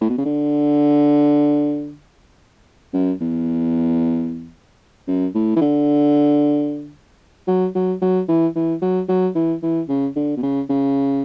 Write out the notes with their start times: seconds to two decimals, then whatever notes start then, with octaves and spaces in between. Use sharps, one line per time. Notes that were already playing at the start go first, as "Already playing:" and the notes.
0.01 A2
0.10 B2
0.18 C#3
0.25 D3
2.93 F#2
3.21 E2
5.08 F#2
5.35 A2
5.56 E3
5.61 D3
7.48 F#3
7.75 F#3
8.02 F#3
8.28 E3
8.56 E3
8.82 F#3
9.09 F#3
9.35 E3
9.63 E3
9.89 C#3
10.16 D3
10.37 B2
10.43 C#3
10.70 C#3